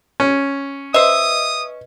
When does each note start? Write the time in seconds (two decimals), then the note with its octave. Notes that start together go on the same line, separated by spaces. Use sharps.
0.20 C#4
0.94 B4 C5 D#5 E5 D#6